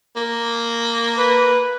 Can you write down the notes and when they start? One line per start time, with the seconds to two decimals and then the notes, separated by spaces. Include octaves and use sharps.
0.16 A#3
1.19 B4